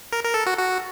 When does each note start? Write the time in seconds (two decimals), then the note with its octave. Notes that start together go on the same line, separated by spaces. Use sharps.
0.13 A#4
0.24 A#4
0.34 A4
0.46 F#4
0.58 F#4